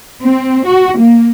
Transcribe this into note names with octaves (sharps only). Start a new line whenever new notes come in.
C4
F#4
A#3